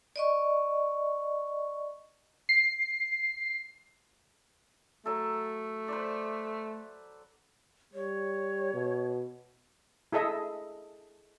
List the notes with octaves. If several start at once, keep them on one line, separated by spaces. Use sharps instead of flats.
D5 D#5 C#6
C7
F#3 A3 A4
B4 C5 D5
G3 C#5
B2
E4 G#4 A4 D#5 E5